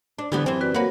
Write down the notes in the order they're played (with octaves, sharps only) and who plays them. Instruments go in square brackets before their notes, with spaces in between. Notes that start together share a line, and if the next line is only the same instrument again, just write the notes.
[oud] D4
[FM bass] D3 [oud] E3 G3 B3 [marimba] G4
[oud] F#2 E3 [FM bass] C4
[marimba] F#4 B4 D5
[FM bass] A#3 [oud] F#4 B4 [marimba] A#4 C#5 F#5